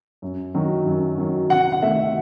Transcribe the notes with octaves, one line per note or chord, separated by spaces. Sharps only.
F#2
D#3 F#3
F#2
D#3 F#3
C3 F#5
F#5
D#3 A3 E5